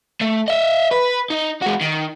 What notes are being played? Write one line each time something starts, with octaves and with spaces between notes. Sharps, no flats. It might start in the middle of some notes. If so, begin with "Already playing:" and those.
A3
D#5 E5
B4
D#4
G#3 F#4
D#3